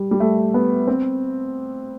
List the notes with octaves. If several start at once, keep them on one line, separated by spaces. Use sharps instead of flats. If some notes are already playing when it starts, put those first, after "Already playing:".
Already playing: G3
G3
A3
B3
C4